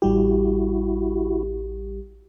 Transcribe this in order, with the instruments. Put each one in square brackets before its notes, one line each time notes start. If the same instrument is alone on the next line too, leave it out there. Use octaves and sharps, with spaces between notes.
[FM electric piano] A1 G3 G4 [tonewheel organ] E4 F#4